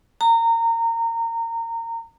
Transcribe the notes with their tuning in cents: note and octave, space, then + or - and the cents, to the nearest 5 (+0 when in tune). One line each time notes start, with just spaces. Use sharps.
A#5 -25